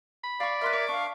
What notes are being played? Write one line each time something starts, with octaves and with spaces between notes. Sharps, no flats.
B5
D5 F5 C#6
A#4 B4 E5 C6 F6
C#5 D6
D4 F5 C#6